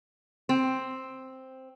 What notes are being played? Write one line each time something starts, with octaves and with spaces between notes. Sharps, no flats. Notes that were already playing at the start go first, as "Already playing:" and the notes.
C4